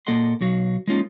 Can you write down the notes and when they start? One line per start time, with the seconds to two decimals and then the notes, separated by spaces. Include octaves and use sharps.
0.07 A#2 A#3 A4 D#5 F#5 C6
0.41 B1 F#3 F#4 F5
0.87 G#3 A#3 C#4 D#4 F4